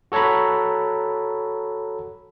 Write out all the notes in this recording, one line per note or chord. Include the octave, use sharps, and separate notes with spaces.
F#4 A4 C#5 A#5 B5